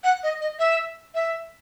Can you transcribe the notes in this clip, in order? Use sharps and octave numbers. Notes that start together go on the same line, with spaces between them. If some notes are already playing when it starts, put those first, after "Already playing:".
F#5
D#5
D#5
E5
E5